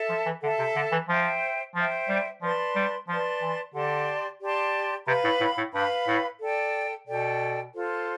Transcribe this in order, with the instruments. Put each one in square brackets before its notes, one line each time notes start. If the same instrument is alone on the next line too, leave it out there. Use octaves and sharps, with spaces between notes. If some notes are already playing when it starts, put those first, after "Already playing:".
Already playing: [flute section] A4 E5 A5
[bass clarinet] F3
E3
[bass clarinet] D3 [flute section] A4 E5 A5
[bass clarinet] C3
D3
E3
[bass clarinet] F3 [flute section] C5 E5 G5
[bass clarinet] F3 [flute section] C5 E5 G5
[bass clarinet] G3
[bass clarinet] F3 [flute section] B4 D5 A5 C6
[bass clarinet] G3
[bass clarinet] F3 [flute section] B4 D5 A5 C6
[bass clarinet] E3
[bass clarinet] D3 [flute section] G4 D5 A5 C6
[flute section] G4 D5 A5 C6
[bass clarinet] C3 [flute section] B4 F5 B5
[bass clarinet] A2
A2
A2
[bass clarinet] G2 [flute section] B4 F5 B5
[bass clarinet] A2
[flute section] A4 D5 G5
[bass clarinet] B2 [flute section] A4 D5 G5
[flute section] F4 A4 C5